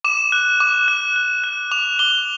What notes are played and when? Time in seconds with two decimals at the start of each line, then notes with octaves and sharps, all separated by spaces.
0.04 D6 E7
0.32 F#6
0.60 D6
0.88 F#6
1.16 F#6
1.44 F#6
1.71 D6 F7
1.99 D6 G7